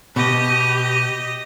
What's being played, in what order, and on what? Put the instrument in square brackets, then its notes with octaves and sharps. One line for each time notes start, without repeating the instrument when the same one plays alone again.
[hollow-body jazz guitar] B2 [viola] G4 [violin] D#5